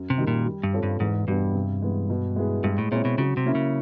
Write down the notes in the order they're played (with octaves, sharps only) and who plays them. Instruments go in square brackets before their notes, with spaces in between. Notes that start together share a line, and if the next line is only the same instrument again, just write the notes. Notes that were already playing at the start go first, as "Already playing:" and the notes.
Already playing: [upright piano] F#2
[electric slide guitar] C3
[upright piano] D#3 G3
[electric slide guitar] A#2
[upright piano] G3
[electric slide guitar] G2
[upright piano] C4 F4 A4 C#5
[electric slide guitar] G2
[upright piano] E2 [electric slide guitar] G#2
[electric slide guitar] G2 [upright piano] B2 G3 B3 D4
[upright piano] C3
E3 G#3 B3
B2
G#3 B3 E4 G#4
[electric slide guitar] G2 [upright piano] G#3
[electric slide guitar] A2
[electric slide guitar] A#2 [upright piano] C4 E4 G#4 C#5
[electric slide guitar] B2
[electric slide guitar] C#3 [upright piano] F#3
[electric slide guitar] C3
[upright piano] A#3 C#4 E4
[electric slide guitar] C#3